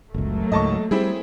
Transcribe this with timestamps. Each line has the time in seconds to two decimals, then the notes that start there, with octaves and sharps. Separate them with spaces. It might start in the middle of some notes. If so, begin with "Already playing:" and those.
0.14 F#1 C#2 F#3 A3 A#3
0.52 C#2 G#2 D#5 A5 C#6
0.91 G3 C4 E4 G#4